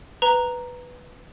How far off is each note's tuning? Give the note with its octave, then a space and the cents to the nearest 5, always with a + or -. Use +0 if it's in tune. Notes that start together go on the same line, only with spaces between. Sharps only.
B4 +0 A#5 +0